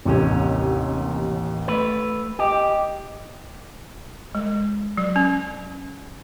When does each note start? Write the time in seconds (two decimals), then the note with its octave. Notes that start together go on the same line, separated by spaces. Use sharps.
0.05 A1 D#2 C3 C#4
1.68 A3 B4
2.39 G4 D#5 G5
4.35 G#3
4.98 F#3
5.16 C#4